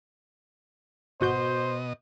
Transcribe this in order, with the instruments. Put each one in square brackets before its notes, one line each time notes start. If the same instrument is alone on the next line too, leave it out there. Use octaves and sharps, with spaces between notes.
[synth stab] G#1 F#4 G6 [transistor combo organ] B2 D#5 [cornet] C5